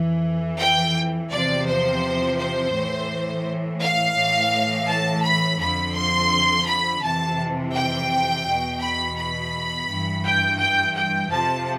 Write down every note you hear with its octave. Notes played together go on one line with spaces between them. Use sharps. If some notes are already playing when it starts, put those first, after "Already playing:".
Already playing: F2 E3
G5
E2 C3 F3 D5
C5
C5
A2 E3
F5
A2 E3
A5
B5
F2 D3 F3 B5
C6
B5
F2 C3 E3 A5
G5
E2 B2
B5
B5
G2 E3
G5
G5
G5
F2 C3 F3 A5